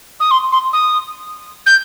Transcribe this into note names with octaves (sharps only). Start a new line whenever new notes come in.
D#6
C6
C6
D#6
G6